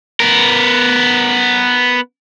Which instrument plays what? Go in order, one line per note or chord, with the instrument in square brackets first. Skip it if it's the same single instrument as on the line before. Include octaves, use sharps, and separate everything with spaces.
[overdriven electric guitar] B3 A#4